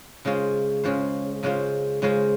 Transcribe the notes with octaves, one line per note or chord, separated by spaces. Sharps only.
C#3 G#3 C#4 F4 C5
C#3 G#3 C#4 F4 C5
C#3 G#3 C#4 F4 C5
C#3 G#3 C#4 F4 C5